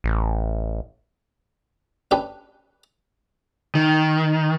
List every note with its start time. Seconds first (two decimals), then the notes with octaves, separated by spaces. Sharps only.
0.04 A1
2.11 C#4 D4 G4 B4
3.75 D#3